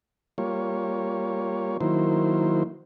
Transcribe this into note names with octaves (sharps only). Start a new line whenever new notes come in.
G3 A#3 F4 C#5
D#3 F#3 A#3 E4 C5